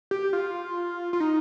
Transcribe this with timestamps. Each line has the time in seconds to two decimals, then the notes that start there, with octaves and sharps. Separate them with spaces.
0.11 G4
0.33 F4
1.13 F4
1.20 D#4